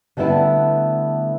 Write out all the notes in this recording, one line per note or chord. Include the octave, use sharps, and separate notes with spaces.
D3 G3 A3 B3 E4 B4